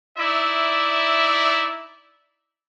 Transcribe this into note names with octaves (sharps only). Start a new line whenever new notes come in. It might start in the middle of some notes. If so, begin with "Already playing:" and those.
D#4 E4 D5 E5